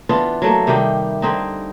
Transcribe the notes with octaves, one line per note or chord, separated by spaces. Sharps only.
E3 B3 D4 F4
F#3 A3 A#3
C3 D#3 G3 G4
D3 C4 D#4